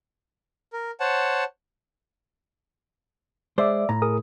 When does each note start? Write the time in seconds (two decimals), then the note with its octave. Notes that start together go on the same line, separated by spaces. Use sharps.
0.73 A#4
1.00 C5 C#5 F#5 A5
3.58 G#3 C5 D5 E5 D6
3.89 A2 A#5
4.02 G#4 A#4 D#6